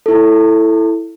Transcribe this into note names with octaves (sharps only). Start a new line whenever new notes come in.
E4 A4